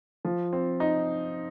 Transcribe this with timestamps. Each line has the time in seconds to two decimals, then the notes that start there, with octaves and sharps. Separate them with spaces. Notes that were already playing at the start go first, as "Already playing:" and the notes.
0.25 F3
0.53 C4
0.80 D#4